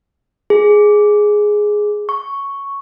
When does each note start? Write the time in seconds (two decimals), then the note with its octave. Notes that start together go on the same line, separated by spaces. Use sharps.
0.50 G#4
2.09 C#6